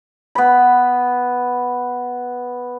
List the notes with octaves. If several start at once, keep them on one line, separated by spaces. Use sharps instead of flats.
B3 B5